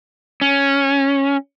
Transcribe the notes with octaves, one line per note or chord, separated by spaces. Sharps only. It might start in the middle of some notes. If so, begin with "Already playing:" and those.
C#4